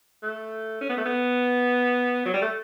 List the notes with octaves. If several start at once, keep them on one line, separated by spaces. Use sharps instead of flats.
A3
C#4
B3
A3
B3
F#3
G3
A3